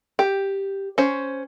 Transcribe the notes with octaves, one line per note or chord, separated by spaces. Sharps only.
G4
C#4 C5